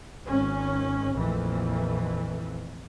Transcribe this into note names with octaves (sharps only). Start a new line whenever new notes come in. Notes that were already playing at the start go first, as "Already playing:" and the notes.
G#1 C#4
A#1 F2 E3 A3